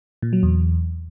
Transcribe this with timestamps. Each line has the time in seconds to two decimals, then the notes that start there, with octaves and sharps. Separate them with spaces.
0.22 A#2
0.33 F#3
0.43 E2